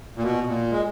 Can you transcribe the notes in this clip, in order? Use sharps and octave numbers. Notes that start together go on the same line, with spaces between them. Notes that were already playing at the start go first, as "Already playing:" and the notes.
A#2
B2
A#2
G#3